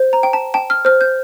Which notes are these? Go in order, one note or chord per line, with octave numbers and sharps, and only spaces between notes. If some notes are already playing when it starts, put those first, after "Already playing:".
Already playing: C5
A#5
G5
A5
G5 A5
F6
C5 F6
G6